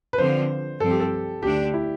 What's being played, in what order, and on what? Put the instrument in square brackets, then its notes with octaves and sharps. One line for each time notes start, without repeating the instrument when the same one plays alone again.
[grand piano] B4
[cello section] D3 F3 C4 F4 [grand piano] C5
[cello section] G2 F3 C4 [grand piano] A4
[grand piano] G4
A4
[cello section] D2 D3 A3 D4 [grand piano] G4
[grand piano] E4